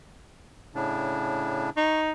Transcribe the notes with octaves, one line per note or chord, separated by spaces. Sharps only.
A2 C#3 D4
D#4 C#6